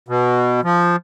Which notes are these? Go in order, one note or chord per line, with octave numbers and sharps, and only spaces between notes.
B2
F3